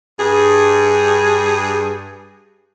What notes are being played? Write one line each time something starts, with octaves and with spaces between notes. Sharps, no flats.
G2 G#4